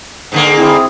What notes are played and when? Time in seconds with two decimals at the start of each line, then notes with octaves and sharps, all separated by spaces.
0.32 G#2 D3 A#3
0.57 C4 E4 G#4